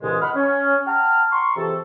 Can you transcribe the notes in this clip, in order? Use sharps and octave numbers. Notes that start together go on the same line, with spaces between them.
C2 G2 A#2 C#3 E3 G#3
D#5 F#5 B5 F6
C#4
F#5 G5 A5 A#5 F6
A#5 C6 C#6
F2 C3 E3 G#4 A4